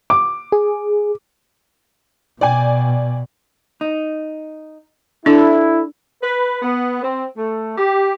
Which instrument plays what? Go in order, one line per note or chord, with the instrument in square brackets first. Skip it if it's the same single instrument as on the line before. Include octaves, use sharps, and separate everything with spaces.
[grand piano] D6
[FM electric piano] G#4
[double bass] B2 [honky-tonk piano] D5 G5 G#5
[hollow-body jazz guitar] D#4
[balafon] D4 [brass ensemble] E4 [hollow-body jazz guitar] A4 D5 A5
[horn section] B4
B3
C4
A3
G4